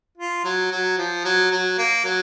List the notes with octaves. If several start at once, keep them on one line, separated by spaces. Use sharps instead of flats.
F4
F#3
F#3
F3
F#3
F#3
A#3
F#3